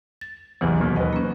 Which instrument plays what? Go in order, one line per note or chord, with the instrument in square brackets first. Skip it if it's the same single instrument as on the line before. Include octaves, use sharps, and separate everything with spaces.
[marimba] A6
[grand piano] A1 E2 [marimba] C3 E3 F#3
[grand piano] D#2 B2
[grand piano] B4 D#5 [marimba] F#5
[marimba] A#3 C#4